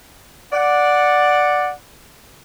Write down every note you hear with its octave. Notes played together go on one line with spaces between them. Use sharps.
D5 F#5